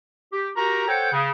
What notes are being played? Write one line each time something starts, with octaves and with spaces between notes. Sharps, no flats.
G4
F#4 G4 A#4 A#5
A4 C5 C#5 F#5 G5
C#3